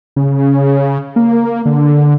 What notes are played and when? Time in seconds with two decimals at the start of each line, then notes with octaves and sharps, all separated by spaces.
0.16 C#3
1.16 A#3
1.66 D3